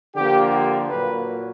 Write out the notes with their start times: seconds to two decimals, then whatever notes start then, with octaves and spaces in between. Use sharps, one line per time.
0.15 D3 F3 A#3 G4
0.52 G4
0.89 A#2 F#3 A#3 B4